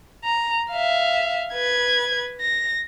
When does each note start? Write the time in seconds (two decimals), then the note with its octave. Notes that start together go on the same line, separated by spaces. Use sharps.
0.24 A#5
0.70 E5 F5
1.54 B4 G#6
2.41 A#6